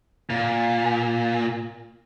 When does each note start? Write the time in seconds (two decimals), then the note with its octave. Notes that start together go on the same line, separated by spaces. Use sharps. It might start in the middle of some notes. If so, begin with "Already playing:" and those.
0.30 A#2